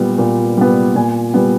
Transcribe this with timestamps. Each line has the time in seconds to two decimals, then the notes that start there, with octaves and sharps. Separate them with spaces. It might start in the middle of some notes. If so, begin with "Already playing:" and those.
Already playing: A#2 G3 B3
0.18 A#2
0.57 G3 B3
0.95 A#2 G#5
1.34 G3 B3